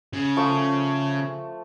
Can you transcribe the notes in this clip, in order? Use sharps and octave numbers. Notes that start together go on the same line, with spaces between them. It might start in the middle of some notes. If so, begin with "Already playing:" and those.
C#3
F3 A3 C#6